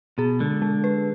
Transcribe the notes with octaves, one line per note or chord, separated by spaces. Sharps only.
B2 G#4
D3 G#3
G#3
B4